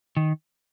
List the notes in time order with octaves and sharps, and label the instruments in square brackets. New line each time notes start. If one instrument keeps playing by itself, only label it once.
[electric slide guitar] D#3